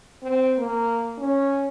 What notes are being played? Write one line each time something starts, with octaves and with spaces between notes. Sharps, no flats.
C4
A#3
C#4